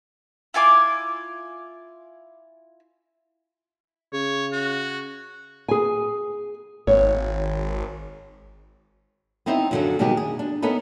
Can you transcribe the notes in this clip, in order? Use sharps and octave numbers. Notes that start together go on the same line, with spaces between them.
E4 F4 G#5 D6
C#3 C#5
F#4
G#4 G#5
G#1 C#5
B3 C4 D#4 E4 C5
F#2 A2 D3 D#3 F3 F#3
B2 D#3 G3 G#3 D#4 G4
G#4
D4
B3 C#4 D#4 A4 B4